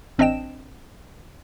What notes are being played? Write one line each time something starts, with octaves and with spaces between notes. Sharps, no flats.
A1 C4 D4 D#5 G5 E7